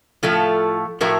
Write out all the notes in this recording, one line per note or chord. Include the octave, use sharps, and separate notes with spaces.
A2 F3 A3 F4 A4
A2 F3 A3 F#4 A#4